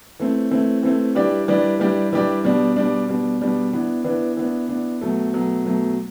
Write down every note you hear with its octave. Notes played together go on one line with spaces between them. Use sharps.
E3 A3 C4
E3 A3 C4
E3 A3 C4
E3 G3 D4 G4 D5
E3 G3 D4 G4 D5
E3 G3 D4 G4 D5
E3 G3 D4 G4 D5
B2 G3 D4
B2 G3 D4
B2 G3 D4
B2 G3 D4
E3 B3 D4
E3 B3 D4
E3 B3 D4
E3 B3 D4
B2 F#3 A3
B2 F#3 A3
B2 F#3 A3